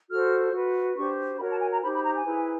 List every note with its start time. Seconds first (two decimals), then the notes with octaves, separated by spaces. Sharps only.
0.10 F#4 A4 C5 F6
0.52 F#4 B4
0.96 D4 G4 C5 C#6
1.39 F#4 A#4 C#5 B5
1.50 A5
1.60 G#5
1.71 A#5
1.82 D#4 G4 C5 B5
1.93 B5
2.04 A#5
2.15 G#5
2.25 E4 G#4 B4